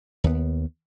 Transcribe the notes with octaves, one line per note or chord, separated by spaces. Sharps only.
D#2 B3